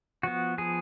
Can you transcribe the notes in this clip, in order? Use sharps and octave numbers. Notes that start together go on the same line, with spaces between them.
F3 B3 F#4
F3 B3 G#4